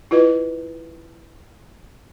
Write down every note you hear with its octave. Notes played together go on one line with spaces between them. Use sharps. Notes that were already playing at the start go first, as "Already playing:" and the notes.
E4 F4 B4 D#5